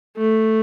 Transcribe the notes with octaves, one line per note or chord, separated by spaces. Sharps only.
A3